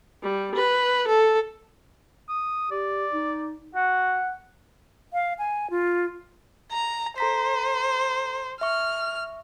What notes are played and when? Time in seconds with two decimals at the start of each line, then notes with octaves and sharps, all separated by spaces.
0.23 G3
0.55 B4
1.08 A4
2.29 D#6
2.71 G4 D5
3.12 D#4
3.76 F#4 F#5
5.13 F5
5.38 G#5
5.70 F4
6.72 A#5
7.18 A4 C5 A#5 B6
8.61 E5 C#6 F6